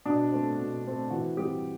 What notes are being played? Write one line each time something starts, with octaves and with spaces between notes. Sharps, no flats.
B2 D4
A3 C4
B2
A3 C4
E3 F#4
G3 C4 G4